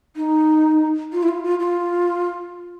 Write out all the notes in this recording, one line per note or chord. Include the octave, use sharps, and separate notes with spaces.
D#4
F4
E4
F4
F4
F4